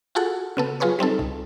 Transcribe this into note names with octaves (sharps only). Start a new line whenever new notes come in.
F4 F#4 G#4 A4 F#5
C#3 B3 A4
F#3 F4 G#4 B4 C#5
G3 C4 D#4 A4
C2